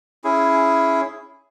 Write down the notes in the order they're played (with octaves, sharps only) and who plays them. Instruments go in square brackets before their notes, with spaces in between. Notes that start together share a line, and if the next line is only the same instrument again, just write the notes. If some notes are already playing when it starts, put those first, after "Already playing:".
[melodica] C#4 E4 G#4